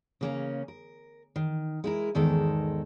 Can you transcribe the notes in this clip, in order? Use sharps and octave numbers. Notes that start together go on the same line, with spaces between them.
C#3 A#3 C#4
A#4
D#3
G#3 E4 A#4
E2 G#2 D#3 G#3 A4 A#4